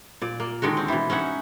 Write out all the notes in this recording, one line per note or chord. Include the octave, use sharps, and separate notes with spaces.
A#2 D5
A#3
D3 D#3 G#3 F#4
C4
B2 E3
C#4 D#4 E5 F#5